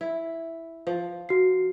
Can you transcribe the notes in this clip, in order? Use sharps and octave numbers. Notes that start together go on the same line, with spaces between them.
E4
F3
F#4 C7